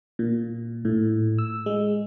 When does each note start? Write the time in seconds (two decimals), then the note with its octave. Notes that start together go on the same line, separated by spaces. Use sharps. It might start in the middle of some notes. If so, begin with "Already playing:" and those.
0.19 A#2
0.85 A2
1.39 E6
1.66 G#3